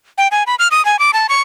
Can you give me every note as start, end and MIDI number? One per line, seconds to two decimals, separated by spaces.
0.18 0.28 79
0.31 0.43 80
0.47 0.55 83
0.59 0.68 89
0.71 0.84 87
0.85 0.99 80
0.99 1.11 86
1.13 1.27 81
1.29 1.41 85